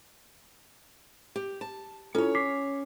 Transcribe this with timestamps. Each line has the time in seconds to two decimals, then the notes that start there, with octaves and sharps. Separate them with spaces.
1.36 G4
1.61 A5
2.15 C#4 E4 F4 A4 C#5
2.35 D6 B6 C7